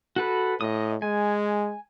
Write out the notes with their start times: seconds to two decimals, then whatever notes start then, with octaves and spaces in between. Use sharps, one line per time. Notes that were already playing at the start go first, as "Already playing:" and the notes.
0.16 F#4 A4 B4
0.61 A2 D#5 D#6
1.02 G#3 G#5